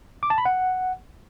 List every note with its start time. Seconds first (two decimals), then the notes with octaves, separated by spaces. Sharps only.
0.23 D6
0.30 A5
0.38 B5
0.45 F#5